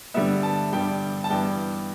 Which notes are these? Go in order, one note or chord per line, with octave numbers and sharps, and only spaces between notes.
G2 D3 G3 B3 E5
A5
G2 D3 G3 B3 G5
A5
G2 E3 G3 B3 G5